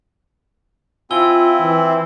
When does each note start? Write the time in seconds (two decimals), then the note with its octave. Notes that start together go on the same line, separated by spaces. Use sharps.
1.11 C4 E4 F4 G#5 E6 G7
1.60 E3